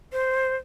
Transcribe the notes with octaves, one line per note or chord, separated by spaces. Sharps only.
C5